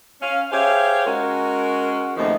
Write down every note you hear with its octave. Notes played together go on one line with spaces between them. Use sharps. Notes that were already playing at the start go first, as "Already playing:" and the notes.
C#4 F5
G4 G#4 C5 C#5 E5 F5
G#3 C#4 F#4 A#4
D#2 C#3 F3 A3 C4 D#4